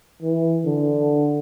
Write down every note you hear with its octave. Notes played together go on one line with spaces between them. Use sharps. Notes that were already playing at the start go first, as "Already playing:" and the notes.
E3
D3